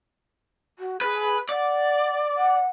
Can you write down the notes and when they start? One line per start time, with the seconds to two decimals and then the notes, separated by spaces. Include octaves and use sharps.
0.79 F#4
1.01 G#4 B4
1.50 D5 F#5
2.37 F#5